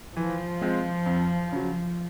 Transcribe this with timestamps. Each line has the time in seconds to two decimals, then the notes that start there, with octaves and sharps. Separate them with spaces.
0.16 E3 F3
0.61 G#3 C4 F4
1.06 F2
1.52 C#3 F#3